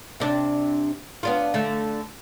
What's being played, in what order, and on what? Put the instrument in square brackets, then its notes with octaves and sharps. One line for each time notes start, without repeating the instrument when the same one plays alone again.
[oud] C3 D4
B3 D4 F4
D3 A3